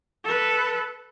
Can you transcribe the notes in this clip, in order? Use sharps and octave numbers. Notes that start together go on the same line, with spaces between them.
A4 B4